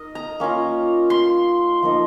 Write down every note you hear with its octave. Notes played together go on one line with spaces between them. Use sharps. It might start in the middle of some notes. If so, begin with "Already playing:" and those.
Already playing: D#4 A#4 D#5
A#5
A#3 C#4 F4
C6
F3 A#3 D#4